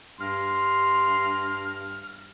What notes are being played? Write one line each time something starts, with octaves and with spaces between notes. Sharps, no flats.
G2 C6 F6